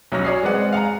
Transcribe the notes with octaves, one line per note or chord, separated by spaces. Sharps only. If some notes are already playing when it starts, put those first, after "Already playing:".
B1 F#2 F#3 F6 A#6
C#5 D5 G#5 D#6 C7
G#3 C4 B4 D5 F#5
F5 F#5 G#5 A#5